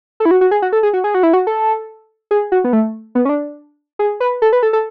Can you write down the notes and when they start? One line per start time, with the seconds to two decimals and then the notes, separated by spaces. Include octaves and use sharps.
0.20 A4
0.25 E4
0.31 F#4
0.41 F#4
0.51 G#4
0.62 F#4
0.73 A4
0.83 G#4
0.94 F#4
1.04 G#4
1.14 F#4
1.23 E4
1.33 F#4
1.47 A4
2.31 G#4
2.52 F#4
2.64 B3
2.73 A3
3.15 B3
3.25 C#4
3.29 D4
3.99 G#4
4.20 B4
4.42 A4
4.53 B4
4.63 A4
4.73 A4